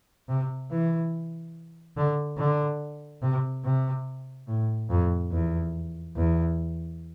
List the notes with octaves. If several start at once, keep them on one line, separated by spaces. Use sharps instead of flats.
C3
E3
D3
D3
C3
C3
A2
F2
E2
E2